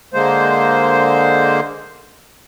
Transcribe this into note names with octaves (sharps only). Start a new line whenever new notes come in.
D3 G#3 A#3 C5